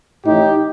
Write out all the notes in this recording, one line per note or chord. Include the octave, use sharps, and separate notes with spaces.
A1 A2 D#4 G4